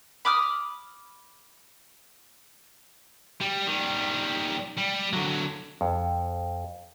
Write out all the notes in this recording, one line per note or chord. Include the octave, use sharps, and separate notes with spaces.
B5 D6 D#6 F6
G3
D#3 G3
G3
D3 F#3
F2